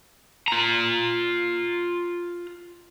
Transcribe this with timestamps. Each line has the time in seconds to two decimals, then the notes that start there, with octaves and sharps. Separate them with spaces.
0.48 F4 A#5